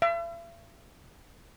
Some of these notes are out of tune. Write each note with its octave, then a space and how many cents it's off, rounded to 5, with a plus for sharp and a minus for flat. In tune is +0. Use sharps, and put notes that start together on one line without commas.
E5 +45